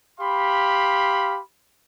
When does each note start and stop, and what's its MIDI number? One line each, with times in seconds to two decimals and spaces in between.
0.20 1.39 67
0.20 1.39 77
0.20 1.39 83
0.20 1.39 84